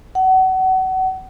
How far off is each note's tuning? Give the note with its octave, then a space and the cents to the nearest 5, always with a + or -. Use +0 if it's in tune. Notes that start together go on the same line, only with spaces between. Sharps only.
F#5 +30